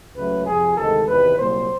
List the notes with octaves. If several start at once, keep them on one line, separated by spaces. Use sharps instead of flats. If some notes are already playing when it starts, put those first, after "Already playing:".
C#2 C#3 F#3 A3 B4
F2 C3 F3 G#4
D2 C3 D#3 G#3 A4
E2 C3 D#3 B4
C2 A#2 F#3 A#3 C5